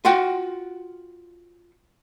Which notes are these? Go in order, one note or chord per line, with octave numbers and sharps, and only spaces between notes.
F4 F#4 F#5 G5